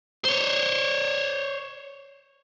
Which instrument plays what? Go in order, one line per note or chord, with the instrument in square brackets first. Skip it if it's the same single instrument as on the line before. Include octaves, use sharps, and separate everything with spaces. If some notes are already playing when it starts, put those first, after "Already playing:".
[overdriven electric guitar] C5 C#5